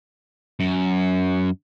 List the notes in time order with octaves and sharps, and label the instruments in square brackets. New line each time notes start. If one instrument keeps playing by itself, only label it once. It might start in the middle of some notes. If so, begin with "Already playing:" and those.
[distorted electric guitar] F#2